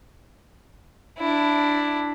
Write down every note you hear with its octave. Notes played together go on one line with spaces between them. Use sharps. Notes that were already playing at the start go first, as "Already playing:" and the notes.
D4 E4